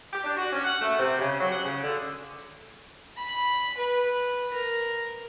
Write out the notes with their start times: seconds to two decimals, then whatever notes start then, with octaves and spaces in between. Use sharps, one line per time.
0.12 G4
0.24 D4
0.37 F#4
0.52 C#4
0.64 F#5
0.81 A3
0.98 C3
1.19 C#3
1.38 F#3
1.52 F#5
1.65 C#3
1.83 D3
3.17 B5
3.77 B4
4.53 A#4